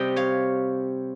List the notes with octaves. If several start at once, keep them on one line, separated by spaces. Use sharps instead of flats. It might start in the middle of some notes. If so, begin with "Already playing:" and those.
Already playing: C3 G3 D#5 G5
C#5 F5